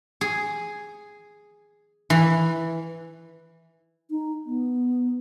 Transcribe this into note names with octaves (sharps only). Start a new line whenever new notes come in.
G#4
E3
D#4
B3